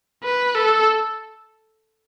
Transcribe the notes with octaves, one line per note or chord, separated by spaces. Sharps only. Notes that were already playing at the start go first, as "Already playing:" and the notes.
B4
A4